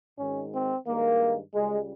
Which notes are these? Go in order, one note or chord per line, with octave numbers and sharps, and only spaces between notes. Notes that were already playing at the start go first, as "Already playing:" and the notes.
G#1 G#2 D#3 G#3 C#4
C4
G2 D#3 G#3 A#3
C#2 C#3 G3 G#3